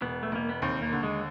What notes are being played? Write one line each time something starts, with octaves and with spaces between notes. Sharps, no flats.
E1 B3
A3
E1 A#3
B3
D#2 C4
A#3
D3
G#3